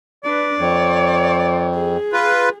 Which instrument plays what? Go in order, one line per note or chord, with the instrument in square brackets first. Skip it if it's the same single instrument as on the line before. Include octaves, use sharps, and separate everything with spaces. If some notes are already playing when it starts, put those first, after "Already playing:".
[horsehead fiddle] D4 B4 [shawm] D5
[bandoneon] F2 [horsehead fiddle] C#5
[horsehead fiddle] G#4
[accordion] F4 B4